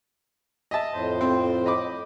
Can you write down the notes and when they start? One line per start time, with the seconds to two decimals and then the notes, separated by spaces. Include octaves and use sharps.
0.71 D#5 E5 A5
0.93 F2 A2 C5
1.21 C4
1.66 D#5 B5 D6